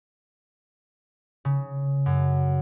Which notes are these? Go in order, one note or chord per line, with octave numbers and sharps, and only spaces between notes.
C#3
F#2